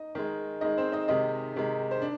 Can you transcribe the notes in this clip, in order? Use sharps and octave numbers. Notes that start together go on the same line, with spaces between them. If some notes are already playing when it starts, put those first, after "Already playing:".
Already playing: D#4 D#5
D#3 G#3
D#3 G#3 D#4 D#5
C4 C5
D#4 D#5
C3 D#3 G#3 D#4 D#5
C3 D#3 G#3
C5
D4